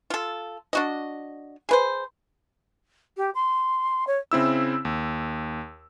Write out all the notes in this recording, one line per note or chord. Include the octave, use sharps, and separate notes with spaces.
F4 A4
D4 F#4 D#5
G#4 B4 C5
G4
C6
C#5
C#3 C4 E4 E6
D#2